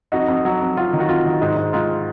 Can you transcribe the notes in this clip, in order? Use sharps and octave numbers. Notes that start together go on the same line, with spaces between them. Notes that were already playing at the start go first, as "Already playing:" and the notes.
F2 D#4 F#4
F2
F#3
F2
F#3 F4
D#3
F#4
F2 F4
D#3
G#2 D#4
G#2
G#2 F4